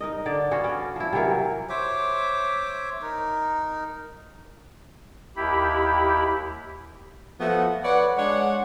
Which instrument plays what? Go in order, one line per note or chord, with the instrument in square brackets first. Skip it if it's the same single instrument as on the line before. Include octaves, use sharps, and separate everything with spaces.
[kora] D#4 A#4 D#5
D3 D5
B3 C#4 F#4 F5
C#4 D5
F3 E4
C3 E3 F#3 A#4
[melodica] C5 C#5 E5 D6
D#4 A#4
[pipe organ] D#2 E4 G4 B5
[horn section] F3 A3 B3 F#4
B4 C#5 D5 F#5
G#3 D4 C#5 F#5